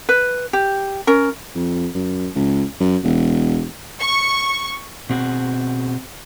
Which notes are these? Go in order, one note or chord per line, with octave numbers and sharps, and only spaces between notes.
B4
G4
C#4 A#4
F2
F#2
C#2
F#2
E1
C#6
B2 C4 F#4 G#4